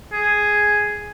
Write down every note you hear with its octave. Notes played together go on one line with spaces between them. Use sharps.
G#4